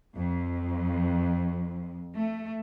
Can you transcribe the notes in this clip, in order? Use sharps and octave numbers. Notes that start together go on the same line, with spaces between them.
F2
A3